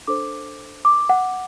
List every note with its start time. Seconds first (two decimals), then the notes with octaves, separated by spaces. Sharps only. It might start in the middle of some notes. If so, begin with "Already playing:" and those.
0.07 D4 A4 C5 D6
0.85 D6
1.09 F#5